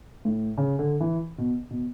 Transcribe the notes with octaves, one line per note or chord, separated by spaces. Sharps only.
A2
C#3
D3
E3
B2
B2